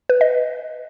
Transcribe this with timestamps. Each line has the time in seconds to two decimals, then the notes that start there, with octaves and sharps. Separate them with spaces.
0.09 B4
0.21 D#5